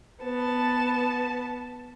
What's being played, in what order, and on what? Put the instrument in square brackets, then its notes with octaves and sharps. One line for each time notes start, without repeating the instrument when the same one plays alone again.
[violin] B3 A5